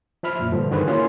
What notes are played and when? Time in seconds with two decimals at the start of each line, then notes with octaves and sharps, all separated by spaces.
0.23 F3 E5 B5 F6
0.39 F#2 A#2
0.52 G2 D3 F3
0.71 D3 D#3 F#4 G#4 B4 C5
0.87 A#3 C#4 E4 F4